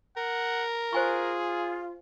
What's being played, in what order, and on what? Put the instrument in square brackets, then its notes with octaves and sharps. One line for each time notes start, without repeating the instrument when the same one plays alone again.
[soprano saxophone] A#4 [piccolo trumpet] F#5
[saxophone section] F4 [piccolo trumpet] G#4 [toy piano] C5 G#5 C#6